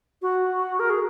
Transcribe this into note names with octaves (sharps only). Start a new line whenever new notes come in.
F#4
A#4
G#4